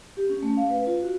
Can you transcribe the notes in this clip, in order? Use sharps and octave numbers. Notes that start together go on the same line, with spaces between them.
G4
C#4
A3
F5
B4
F4
F#4